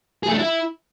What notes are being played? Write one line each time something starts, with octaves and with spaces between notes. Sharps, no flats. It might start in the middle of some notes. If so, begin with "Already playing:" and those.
G#4
A3
D4
E4